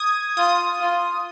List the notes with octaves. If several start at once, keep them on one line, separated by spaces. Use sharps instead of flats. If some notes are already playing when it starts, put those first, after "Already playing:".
Already playing: D#6 G#6
F4 D#6
F4